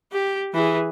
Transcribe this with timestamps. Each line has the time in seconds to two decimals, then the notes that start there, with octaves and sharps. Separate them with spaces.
0.12 G4
0.53 E3 G#4